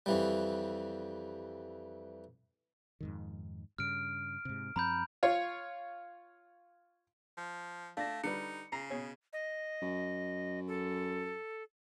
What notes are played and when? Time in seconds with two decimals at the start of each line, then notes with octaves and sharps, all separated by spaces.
0.06 F2 E3 G3
3.01 F2 G#2 D#3
3.78 G2 C#3 F6 D7
4.45 G#2 C3
4.76 F#2 F3 C4 A#5 B5 G6
5.23 F4 C#5
7.38 F3
7.97 A3 D4 D5 F5 A#6
8.24 D3 G3 D#4 B4 C#7
8.72 C#3 A#5 C7
8.90 B2 G#4 C#5
9.33 D#5
9.82 F#2
10.67 A4